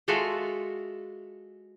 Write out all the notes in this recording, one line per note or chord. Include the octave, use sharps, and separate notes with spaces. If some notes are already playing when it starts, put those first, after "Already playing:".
G#3 F4 F#4 A4 E5 F5